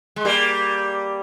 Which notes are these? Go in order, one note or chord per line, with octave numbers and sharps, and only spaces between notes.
G#3
G3 A#3